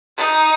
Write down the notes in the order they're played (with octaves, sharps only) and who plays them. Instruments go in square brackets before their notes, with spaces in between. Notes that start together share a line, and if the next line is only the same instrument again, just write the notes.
[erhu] D#4